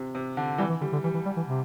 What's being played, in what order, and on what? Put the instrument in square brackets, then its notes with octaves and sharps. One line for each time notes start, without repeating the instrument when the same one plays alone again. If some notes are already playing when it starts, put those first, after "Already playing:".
Already playing: [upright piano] C3
C3
D3
[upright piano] E3 [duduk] G3
[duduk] E3
[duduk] D3 [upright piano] G3
[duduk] D3
[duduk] E3 [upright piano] G3
[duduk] E3
G3
E3
C3